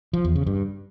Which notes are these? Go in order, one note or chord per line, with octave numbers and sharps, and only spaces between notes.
F3
E2
C#3
G2